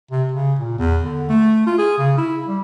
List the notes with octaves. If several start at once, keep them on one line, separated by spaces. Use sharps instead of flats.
C3
C#3
A#2
E2
D3
A3
F4
G#4
C#3
E4
G3